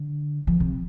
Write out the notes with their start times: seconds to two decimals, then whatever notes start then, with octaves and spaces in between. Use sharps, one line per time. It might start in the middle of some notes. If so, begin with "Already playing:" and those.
Already playing: D3
0.47 F3
0.60 C3